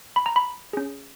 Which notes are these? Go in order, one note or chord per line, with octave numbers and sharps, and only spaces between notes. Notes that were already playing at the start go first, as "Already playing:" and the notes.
B5
A#5
B5
C#4 G#4